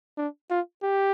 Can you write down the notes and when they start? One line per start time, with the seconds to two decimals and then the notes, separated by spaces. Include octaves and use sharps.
0.18 D4
0.50 F4
0.83 G4